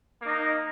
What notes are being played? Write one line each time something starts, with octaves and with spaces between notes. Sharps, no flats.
A#3 D#4 A#4